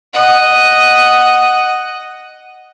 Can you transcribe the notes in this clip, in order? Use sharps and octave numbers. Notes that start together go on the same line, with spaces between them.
D#5 F#5